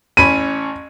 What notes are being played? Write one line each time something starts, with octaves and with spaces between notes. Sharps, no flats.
A1 C#4 B5 D#7